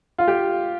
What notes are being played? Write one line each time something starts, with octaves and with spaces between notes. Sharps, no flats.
F4
G4